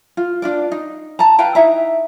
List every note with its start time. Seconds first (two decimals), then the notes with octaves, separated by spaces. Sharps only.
0.17 F4
0.42 D4 F4 D5
0.72 D#4
1.19 A5 A#5
1.38 B4 F5 G5 A#5
1.55 D#4 E4 E5 A#5